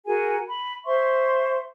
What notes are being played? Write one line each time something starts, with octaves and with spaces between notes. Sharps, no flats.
F#4 G#4 A#4 G#5
B5
C5 E5 C6 C#6